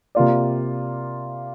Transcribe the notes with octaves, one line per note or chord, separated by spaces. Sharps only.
C3 A#3 F4 D5